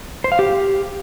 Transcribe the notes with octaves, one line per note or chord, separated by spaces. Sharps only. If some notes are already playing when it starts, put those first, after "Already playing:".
C5
F5
G4